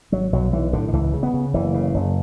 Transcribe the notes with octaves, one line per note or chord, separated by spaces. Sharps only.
G#1 F#3
B1 F#3
B1 E3
A2 D3
D3
C#2 E3
C#3
B3
C#3
F#1 E3
C#3
F#1